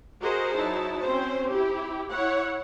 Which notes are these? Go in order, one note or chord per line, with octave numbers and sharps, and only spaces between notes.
F#4 G#4 A#4 C5 D#5
F#3 D#4 E4 A5
C4 C#4 C5
E4 G4
E4 C#5 F#5